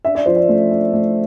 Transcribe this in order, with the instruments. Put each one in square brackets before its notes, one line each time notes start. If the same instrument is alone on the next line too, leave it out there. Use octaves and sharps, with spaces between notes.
[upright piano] D4 E5
D5
F3 C5
D5
A3
D4
A3